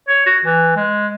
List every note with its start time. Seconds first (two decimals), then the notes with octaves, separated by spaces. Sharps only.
0.09 C#5
0.26 F#4
0.45 E3
0.76 G#3